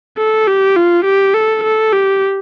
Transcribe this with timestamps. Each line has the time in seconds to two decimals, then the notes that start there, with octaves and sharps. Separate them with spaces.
0.18 A4
0.48 G4
0.76 F4
1.05 G4
1.34 A4
1.63 A4
1.93 G4